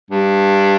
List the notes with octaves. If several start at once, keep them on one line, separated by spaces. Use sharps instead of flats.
G2